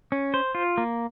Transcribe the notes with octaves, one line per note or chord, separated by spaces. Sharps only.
C#4
C5
F4
A#3